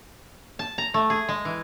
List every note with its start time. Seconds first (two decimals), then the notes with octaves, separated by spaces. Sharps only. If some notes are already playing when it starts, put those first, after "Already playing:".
0.59 A5
0.78 A#5
0.94 A3
1.10 G#4
1.29 G#3
1.45 E3